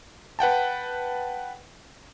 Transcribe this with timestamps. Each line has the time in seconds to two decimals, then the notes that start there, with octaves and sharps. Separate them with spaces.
0.39 B4 F#5 G5 A5